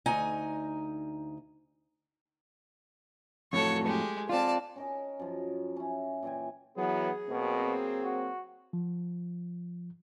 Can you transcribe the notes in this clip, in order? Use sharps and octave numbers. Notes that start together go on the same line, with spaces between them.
D2 D#4 G#5 A#5
F2 A2 F#3 A4 C#5
G#3 G4
C4 F4 D5 A5
C#4 A#4 D#5
F#2 F3
C#4 E4
A#2 E3 G5 G#5
E3 F#3 B3 G#4
B2 F#3 A#3 C4
F#4
F3